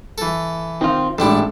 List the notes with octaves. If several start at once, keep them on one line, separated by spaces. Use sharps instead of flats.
E3 A4
D#3 C4 F4
A1 G#2 D4 E4 A4 G5